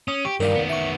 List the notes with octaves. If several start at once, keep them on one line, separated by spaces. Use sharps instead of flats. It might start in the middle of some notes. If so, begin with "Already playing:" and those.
C#4 D#6
G4 C#6
G2 D#3 A#4 D5 F5
D#3 B3
E5 C#6